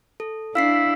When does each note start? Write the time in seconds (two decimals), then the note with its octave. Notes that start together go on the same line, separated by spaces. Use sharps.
0.20 A4
0.55 D4 E4 F5 B6 C7